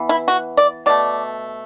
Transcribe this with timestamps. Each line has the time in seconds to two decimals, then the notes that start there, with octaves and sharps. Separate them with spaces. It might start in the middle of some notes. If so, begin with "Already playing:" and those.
Already playing: E3 B3
0.09 E4
0.28 F#4
0.57 D5
0.86 B2 A3 D5